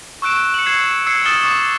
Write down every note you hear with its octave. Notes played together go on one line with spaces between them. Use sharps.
C#6 E6 F#6 D7 E7
C#7 F#7
G#6 C7 E7
E6 G#6 C7 C#7
D#6 F6 A6 E7 G7
C#6 D6